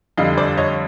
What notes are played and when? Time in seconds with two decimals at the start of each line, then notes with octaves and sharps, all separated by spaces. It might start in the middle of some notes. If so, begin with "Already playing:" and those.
0.17 F2 D3 G3 D#5 F5
0.38 C5 D5
0.57 C#5 D#5